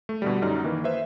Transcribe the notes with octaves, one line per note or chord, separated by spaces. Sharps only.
A3
B2 D3 G3
F#2 D#4 D5 F6
D#3 E3 A#3
B4 C5 E5